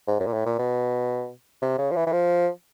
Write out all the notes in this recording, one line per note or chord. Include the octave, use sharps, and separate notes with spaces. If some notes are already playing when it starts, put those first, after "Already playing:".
G#2
F#2
A#2
A2
A#2
B2
C3
C#3
F3
E3
E3
F3